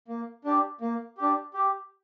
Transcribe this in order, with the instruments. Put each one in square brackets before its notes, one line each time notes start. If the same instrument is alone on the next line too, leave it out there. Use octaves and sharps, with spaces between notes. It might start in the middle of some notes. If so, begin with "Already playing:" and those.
[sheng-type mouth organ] A#3
D4 G4
A#3
D4 G4
G4